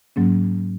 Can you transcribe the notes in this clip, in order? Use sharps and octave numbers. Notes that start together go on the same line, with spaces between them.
G#2 F#3 A#3 C#4